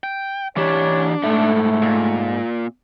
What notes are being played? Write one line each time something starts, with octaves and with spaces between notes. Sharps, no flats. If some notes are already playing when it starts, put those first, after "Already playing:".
G5
E3 D4 G4 C#5
G#2 A3 A4 E5
A#2